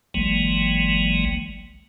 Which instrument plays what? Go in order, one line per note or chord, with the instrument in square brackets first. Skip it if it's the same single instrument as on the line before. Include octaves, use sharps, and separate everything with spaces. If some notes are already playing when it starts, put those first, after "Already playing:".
[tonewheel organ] G1 C2 E3 F#3 G#3 A#3